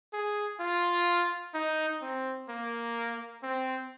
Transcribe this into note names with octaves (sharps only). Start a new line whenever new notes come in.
G#4
F4
D#4
C4
A#3
C4